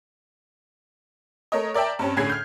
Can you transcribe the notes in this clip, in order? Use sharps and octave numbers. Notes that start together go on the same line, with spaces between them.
A3 A#4 C#5 D#5
A#4 D5 E5 G5 A5
G2 C4 C#4 A5
A2 D3 C#4 G#4 G#6 C7
F6 G6